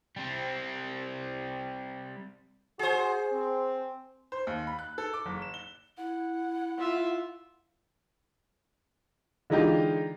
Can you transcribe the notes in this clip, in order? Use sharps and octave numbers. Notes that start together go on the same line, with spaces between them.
G3 C4
F#4 G#4 C5
C4
C5
D#2
B5
F#6
A4
D6
F#1
E7
G7
E4 F#5
F4 E5
D3 E3 G#3 D#4 F4 G4